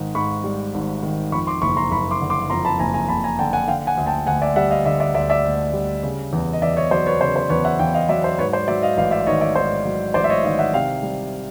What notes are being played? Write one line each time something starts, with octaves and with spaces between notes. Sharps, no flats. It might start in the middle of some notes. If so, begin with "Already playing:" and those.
Already playing: G#1 G#2 D#3
G#2 B5 C#6
G3
G#1
D#3
F2 B5 C#6
C6 D6
F#1 B5 C#6
A#5 C6
F#1 B5 C#6
C6 D6
D3
C6 D6
F2 A#5 C6
A5 B5
F#1 G#5 A#5
G#5 A#5
F#1 A5 B5
G#5 A#5
D3 G5 A5
F#5 G#5
D3 F5 G5
F#5 G#5
D2
G5 A5
D2 F#5 G#5
D5 E5
G3 E5 F#5
D#5 F5
D3 D5 E5
D5 E5
D2 D5 E5
D5 E5
D2
G3
C#3
E2
D#5
E2 D5 E5
C#5 D#5
F#3 C5 D5
B4 C#5
C#3 C5
C5
E2 B4 C#5
E5 F#5
E2 F5 G5
D#5 F5
F#3 D5 E5
C5
G#2 B4 C#5
C5 D5
F#3 D5 E5
D#5 F5
A1 D#5 F5
D5 E5
D#3 C#5 D#5
D5 E5
G#2 C5
F#3
A1 C5 D5
E5
C#5 D#5
D#3 D#5 F5
E5 F#5
C3 F5 G5
G3